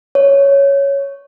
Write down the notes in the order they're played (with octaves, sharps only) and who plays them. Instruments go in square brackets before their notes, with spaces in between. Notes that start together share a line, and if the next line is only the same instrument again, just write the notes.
[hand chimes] C#5